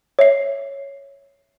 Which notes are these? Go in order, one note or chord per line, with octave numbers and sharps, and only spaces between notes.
C#5 E5 C7